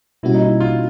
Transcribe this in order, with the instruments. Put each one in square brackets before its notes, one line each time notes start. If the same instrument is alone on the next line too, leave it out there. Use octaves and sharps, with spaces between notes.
[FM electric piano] B2 G3 A#3 C#4 F#4 [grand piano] E4
[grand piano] D#4
E4
F4